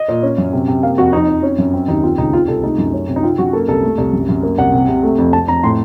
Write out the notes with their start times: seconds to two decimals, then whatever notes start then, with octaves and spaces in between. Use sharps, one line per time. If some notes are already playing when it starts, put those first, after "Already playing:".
Already playing: D#5
0.09 A#2
0.23 C#4
0.38 F#2
0.53 C3
0.68 C3
0.83 A#3 F5
0.98 F2 F#4
1.13 F2 D#4
1.28 F2
1.43 C#4
1.58 F#2
1.73 C4
1.88 D#2 D#4
2.03 C4 F4
2.18 C#2 D#4
2.33 C4 F4
2.48 C2 A4
2.63 A3 D#4
2.78 F#2
2.93 C#4
3.08 C3
3.16 D#4
3.23 C4 F4
3.38 F#2 F#4
3.53 A#3 A4
3.68 C2 A4
3.83 A3
3.98 C2
4.13 F#2
4.28 F#2
4.43 A#3
4.58 C2 F#5
4.73 C3
4.88 C3
5.03 A3
5.18 F2
5.33 F2 A5
5.48 F2 A#5
5.63 A2 C6